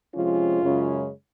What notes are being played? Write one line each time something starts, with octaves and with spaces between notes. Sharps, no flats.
C3 F3 G#3 C#4 F4
F#2 C#3 G#3 C#4